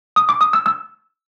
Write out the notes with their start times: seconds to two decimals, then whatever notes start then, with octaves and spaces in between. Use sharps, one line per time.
0.16 D#6
0.29 D6
0.41 D#6
0.53 E6
0.66 E6